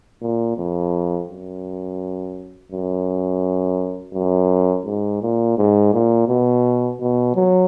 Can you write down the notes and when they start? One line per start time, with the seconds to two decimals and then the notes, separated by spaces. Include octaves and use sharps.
0.22 A#2
0.57 F2
1.28 F#2
2.72 F#2
4.14 F#2
4.86 G#2
5.22 A#2
5.58 G#2
5.93 A#2
6.28 B2
7.00 B2
7.35 F#3